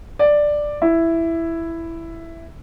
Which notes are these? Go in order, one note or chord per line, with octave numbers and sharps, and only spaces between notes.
D5
E4